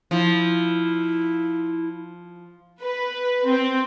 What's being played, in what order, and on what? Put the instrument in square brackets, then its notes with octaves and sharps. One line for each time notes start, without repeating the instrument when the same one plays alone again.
[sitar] F3 [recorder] E4
[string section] B4
C4